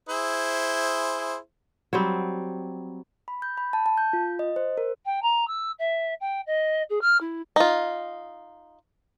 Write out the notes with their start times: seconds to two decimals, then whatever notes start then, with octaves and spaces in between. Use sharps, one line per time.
0.09 E4 G#4 C5
1.93 F#3 G3 C4
3.28 B5
3.42 G6
3.57 B5
3.73 A5
3.86 A5
3.98 G6
4.13 F4
4.39 D#5
4.56 C5
4.77 A#4
5.06 G5
5.23 A#5
5.48 E6
5.79 E5
6.21 G5
6.47 D#5
6.90 G#4
7.02 F6
7.21 E4
7.56 D#4 F4